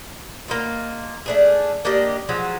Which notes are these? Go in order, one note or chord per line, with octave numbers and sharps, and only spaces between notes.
A#3 D#4 F4
A3 D4 G#4
A#3 D4 G4 D#5
F3 F#3 G#3